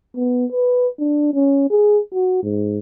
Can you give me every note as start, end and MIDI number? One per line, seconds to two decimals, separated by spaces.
0.16 0.46 59
0.52 0.88 71
0.99 1.34 62
1.34 1.66 61
1.70 1.99 68
2.14 2.40 66
2.43 2.79 44